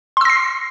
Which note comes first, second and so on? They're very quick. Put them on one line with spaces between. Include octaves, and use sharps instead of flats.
C6 E6 A#6 C7